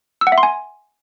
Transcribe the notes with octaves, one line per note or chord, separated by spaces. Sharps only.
E6
F#5
E5
C6
G#5